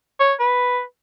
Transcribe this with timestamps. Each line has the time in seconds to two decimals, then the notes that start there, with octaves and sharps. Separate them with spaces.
0.20 C#5
0.39 B4